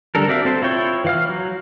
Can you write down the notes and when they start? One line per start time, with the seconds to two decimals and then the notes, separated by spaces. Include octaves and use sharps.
0.15 D3 G3 D4 A4 A#4
0.28 C4 F#4 D5 E5 F5
0.45 C4 A4 C5
0.62 E4 F4 C#5 G5 C#6
1.04 E3 F5 F6
1.29 F#3